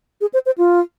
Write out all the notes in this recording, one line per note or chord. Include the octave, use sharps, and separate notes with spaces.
G#4
C5
C5
F4